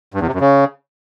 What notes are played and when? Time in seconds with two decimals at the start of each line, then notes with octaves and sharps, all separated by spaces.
0.14 G2
0.21 E2
0.27 C3
0.34 F#2
0.40 C#3